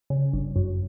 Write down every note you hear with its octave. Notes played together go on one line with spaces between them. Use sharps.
C#3
G1
F#2